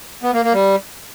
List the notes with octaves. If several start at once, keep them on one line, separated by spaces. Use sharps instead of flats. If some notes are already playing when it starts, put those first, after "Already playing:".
B3
A#3
A#3
G3